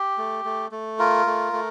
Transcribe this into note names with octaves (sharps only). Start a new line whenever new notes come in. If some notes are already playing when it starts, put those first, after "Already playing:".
Already playing: G4
A3
A3
A3
F4 A#4
A3
A3